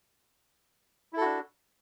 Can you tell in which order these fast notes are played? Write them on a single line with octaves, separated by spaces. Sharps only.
E4 A4 F#4 D4